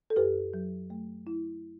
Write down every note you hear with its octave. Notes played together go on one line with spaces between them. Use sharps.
A4
F#2 G4 B4
F#3
A3
E4